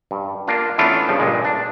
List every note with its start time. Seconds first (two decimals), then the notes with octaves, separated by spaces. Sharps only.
0.11 G2
0.48 A#3 D4 F4
0.78 E3 A3 B3 C#4 D4 F4
1.08 G2 C#3 F3
1.20 G2 A#2 G#3
1.45 D4